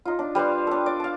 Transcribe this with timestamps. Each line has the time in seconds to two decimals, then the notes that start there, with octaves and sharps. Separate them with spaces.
0.05 D#4 F4
0.19 D4
0.35 G3 B4 C5 F5
0.67 D4 A4
0.86 D5
1.00 F5 A5